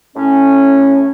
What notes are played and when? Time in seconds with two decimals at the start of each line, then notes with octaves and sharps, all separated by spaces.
0.16 A2 C#4